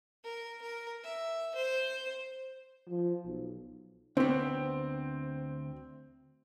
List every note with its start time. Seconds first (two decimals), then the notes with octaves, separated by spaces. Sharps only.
0.24 A#4
0.62 A#4
1.03 E5
1.55 C5
2.89 F3
3.26 B1
4.17 D2 B3 C4